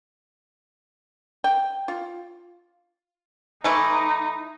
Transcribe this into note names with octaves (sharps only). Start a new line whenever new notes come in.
G5
F4
E3 A3 D#4 E4